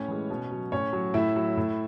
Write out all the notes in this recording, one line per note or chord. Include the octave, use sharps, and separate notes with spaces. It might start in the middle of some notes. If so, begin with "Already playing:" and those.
Already playing: A2 C#4 C#5
E3 G#3
B2
F#3
A2 C#4 C#5
F#3
A2 E4 E5
F#3
A2